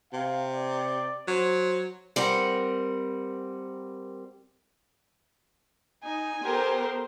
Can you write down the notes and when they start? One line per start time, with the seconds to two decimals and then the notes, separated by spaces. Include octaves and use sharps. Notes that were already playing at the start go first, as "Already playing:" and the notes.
0.13 C3 F5
0.54 D5
1.28 F#3 C5
2.16 G3 C4 A#4 F#5
6.04 D#4 G#5
6.44 B3 G4 A4 A#4 C5